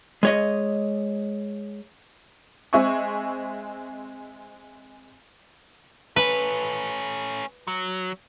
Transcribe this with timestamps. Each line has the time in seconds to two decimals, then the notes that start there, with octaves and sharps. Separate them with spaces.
0.23 G#3 C#5 D#5
2.73 G#3 C4 E5 G#5 C#6
6.16 A3 C#4 B4
7.67 F#3